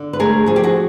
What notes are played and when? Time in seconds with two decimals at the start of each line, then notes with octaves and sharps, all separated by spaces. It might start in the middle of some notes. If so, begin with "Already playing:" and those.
Already playing: D3
0.13 B4
0.19 A3 G#4 A#4
0.46 F3 G#4
0.56 G4
0.63 F#4 G#4